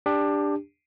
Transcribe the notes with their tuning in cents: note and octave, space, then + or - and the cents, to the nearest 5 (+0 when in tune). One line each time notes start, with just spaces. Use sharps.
D4 +0 G4 +20